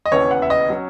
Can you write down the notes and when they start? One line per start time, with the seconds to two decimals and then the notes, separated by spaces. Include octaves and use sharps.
0.06 D#5
0.12 E1 D#2 C#3 E3 B3 C#5
0.31 F#5
0.42 E5
0.50 D#5
0.70 F#3 C#4